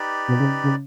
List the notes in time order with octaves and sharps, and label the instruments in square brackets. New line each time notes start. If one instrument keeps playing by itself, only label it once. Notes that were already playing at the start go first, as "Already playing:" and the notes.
Already playing: [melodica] D#4 G4 B4 D5
[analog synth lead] B2
C#3
C#3